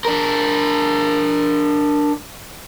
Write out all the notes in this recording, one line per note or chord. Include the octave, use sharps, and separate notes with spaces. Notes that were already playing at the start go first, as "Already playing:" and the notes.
D4 A#4